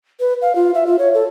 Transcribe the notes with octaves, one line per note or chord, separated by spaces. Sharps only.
B4
F5
F4
E5
F4
C#5
A4